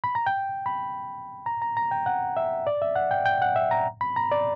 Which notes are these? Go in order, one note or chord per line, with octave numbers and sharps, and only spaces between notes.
B5
A#5
G5
B5
A#5
A#5
A#5
G5
F#5
E5
D5
E5
F#5
G5
G5
F#5
E5
A#5
B5
A#5
D5